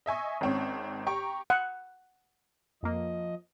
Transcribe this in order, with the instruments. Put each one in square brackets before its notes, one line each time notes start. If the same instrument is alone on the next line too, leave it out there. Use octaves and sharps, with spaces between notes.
[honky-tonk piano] D#5 E5 G#5 C#6
G#1 G#2 C4 C#4 C#6
G4 A#5 C#6 D7
[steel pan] F#5
[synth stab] F2 A#3 [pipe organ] F3 D#5